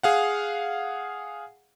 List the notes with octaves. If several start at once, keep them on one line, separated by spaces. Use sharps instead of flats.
G#4 F5 F#5